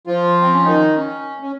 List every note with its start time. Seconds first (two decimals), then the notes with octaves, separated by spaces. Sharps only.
0.07 F3 F4
0.41 C4
0.53 C#4
0.65 D#3 D#4
0.95 C#4
1.42 C#4